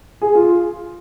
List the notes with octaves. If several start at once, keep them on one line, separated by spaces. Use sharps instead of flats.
G#4
F4